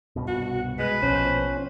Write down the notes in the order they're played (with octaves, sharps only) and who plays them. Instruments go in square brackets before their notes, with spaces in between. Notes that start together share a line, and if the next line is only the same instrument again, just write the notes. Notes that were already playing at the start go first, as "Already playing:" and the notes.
[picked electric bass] C2 G2 B2
[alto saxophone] F#4
[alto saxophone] G#3 [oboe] B4
[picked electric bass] A#1 B2 F3 [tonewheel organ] C#4 [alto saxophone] C5